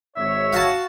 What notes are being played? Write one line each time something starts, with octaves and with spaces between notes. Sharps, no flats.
G#1 C#5 E5
F#4 F5 A5